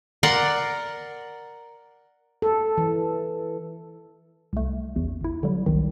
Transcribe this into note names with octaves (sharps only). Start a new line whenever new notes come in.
A#4 D5 F#5 C6
A4
E3
C2 A3
A1 E2
G1 E4
D3 F#3 G3
G1 C2 D#3